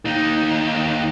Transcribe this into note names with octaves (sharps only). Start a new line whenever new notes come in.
D#2 D#4